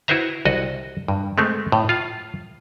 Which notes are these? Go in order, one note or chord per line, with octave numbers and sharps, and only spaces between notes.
E4 F#4 B4 C5 E5 A#5
C2 F#4 D#5
G2
G#3 A3 C4
A2
F4 F5